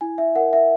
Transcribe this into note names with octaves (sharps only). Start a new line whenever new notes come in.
E4 G#5
E5
A#4 F#5
E5